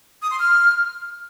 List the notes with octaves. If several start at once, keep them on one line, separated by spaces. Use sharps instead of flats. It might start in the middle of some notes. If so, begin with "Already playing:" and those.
D#6
C6
F6